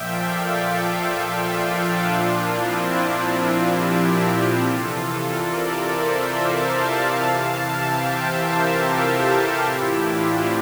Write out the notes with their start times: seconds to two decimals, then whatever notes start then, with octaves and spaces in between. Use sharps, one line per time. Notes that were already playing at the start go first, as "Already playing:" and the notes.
Already playing: A#2 F3 D5 E5 F5 G5
0.22 F4 A4
1.47 D4 F4
2.09 A#2 F3 D4 F4
2.40 C4 E4
2.72 D4
3.34 D4
3.65 E4 G4
3.97 D4 F4
4.28 E4 G4
4.59 C3 E3 F4 A4
4.91 F4 A4
5.22 A#4 D5
5.84 C5 E5
6.46 F5 A5
7.09 C3 E3 F5 A5
7.40 F5 A5
7.71 E5 G5
8.03 C5 E5
8.34 G4 A#4
8.65 F4 A4
8.96 F4 A4
9.27 E4 G4
9.59 A2 E3 E4 G4
9.90 D4 F4
10.21 C4 E4